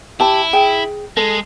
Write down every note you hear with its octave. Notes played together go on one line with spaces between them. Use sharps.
E4 G4 A5
G#4 G5
G#3 A4